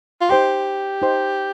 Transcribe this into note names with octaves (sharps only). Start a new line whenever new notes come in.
F4
D#4 G4 C5 G5 C6
D#4 C5 G5 C6